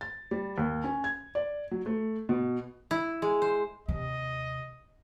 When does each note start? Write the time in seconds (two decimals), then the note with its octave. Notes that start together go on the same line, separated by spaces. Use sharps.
0.01 A6
0.31 G3
0.58 D#2
0.84 C#4
1.04 G#6
1.35 D5
1.71 F#3
1.86 A3
2.29 B2
2.91 E4
3.22 G#3
3.42 C5
3.88 D#2 C3 D#5